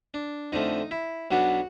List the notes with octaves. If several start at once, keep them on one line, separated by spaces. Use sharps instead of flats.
D4
F2 D3 F3 A3 D#4
E4
B1 B2 F#3 B3 D4 F#4